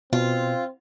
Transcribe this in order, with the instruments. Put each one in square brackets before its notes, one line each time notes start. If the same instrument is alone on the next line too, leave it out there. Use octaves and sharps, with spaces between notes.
[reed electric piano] B2 [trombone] C4 [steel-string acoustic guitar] F4